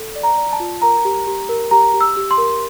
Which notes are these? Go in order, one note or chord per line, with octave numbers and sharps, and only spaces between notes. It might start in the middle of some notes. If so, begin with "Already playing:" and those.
Already playing: A4
D5
A#5
D5
A5
F4
A#4 A#5
G4
G4
A#4
G4 A#5
G4
E6
G4
C6
A#4